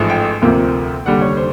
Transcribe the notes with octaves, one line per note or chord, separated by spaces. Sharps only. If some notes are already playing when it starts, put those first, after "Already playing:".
Already playing: A1 G#2 F3 A3
G5
D2 C3 F3 A#3
F1 D#2 D3 G3 F#5
C#5
C5